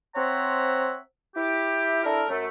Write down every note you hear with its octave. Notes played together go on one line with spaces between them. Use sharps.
C4 C5 C#5 E5 F#5 A#5
E4 G4
D4 E4 A4 A#4
F#2 A3